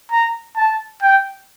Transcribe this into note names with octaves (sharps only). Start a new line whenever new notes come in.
A#5
A5
G5